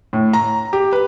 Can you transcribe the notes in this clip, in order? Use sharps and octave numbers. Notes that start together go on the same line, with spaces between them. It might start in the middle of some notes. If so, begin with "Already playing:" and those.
A2
A#5
G4
B4